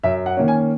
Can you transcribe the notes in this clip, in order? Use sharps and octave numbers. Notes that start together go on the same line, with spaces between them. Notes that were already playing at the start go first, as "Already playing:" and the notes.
F#2 E5
F#5
D#3 A#3 C#4
G#5